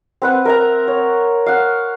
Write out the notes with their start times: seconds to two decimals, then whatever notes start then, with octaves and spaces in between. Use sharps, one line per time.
0.22 C4 B4 F#5
0.45 A#4 E5 A#5
0.88 C#5
1.46 F5 F#5